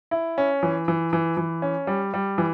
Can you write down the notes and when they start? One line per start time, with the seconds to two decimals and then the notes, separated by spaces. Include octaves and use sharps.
0.11 E4
0.38 C#4
0.63 E3
0.88 E3
1.13 E3
1.37 E3
1.62 C#4
1.87 G3
2.14 G3
2.38 E3